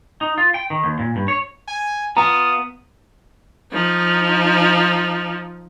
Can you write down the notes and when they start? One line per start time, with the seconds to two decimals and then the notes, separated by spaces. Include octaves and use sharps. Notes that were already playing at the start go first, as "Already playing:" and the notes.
0.21 D#4
0.38 F4
0.54 G5
0.70 D#3
0.84 D#2
0.99 A#2
1.16 G2
1.28 C#5
1.67 G#5
2.17 B3 F4 A#5 D#6
3.73 F3 D#4